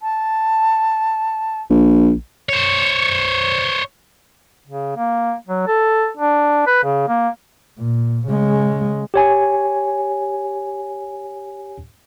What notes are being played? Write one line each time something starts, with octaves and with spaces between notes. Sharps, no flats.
A5
A#1
C5 C#5
C#3
A#3
F#3
A4
D4
B4
C#3
A#3
A#2
C#3 G#3
G4 C#5 G#5